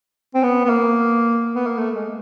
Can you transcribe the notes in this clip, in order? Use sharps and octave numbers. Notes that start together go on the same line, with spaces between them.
C4
B3
B3
A#3
B3
A#3
A3
G#3